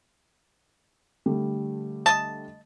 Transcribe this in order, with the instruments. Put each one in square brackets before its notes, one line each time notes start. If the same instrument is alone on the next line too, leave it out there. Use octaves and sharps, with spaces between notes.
[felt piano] D3 G3 A3
[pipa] D#5 E5 A5